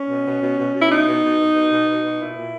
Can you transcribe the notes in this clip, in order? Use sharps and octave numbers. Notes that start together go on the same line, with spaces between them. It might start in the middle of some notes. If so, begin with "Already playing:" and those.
Already playing: C#4
B2
B2
B2
B2
B2
E4
B2 D#4
B2
B2
B2
B2
B2
B2
B2
A#2 E4
A#2